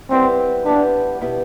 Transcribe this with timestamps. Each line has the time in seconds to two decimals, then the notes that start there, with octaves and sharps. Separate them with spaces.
0.10 G3 B3 C4 E4 G4 B4
0.66 G3 B3 D4 E4 G4 B4
1.21 B2 B3 E4 G4